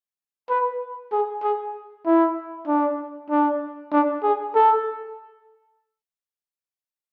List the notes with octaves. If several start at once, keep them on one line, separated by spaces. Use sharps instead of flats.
B4
G#4
G#4
E4
D4
D4
D4
G#4
A4